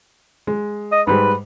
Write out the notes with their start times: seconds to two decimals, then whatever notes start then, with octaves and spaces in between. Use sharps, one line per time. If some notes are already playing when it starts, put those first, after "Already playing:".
0.47 G#3
0.92 D#5
1.07 G#2 G3 G#3 B4